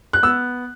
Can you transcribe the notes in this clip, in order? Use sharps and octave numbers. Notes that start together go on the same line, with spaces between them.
F#6
B3 E6